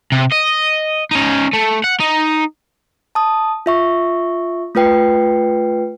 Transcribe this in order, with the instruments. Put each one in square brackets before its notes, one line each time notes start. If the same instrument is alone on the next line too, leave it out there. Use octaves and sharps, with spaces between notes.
[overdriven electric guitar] C3
D#5
C#4 D#4
A3
F#5
D#4
[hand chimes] A5 D#6
F4 E5 C#6
A3 F4 B4 G5 C7